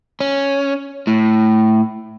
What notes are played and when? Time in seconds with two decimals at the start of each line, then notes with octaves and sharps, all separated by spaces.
0.20 C#4
1.07 A2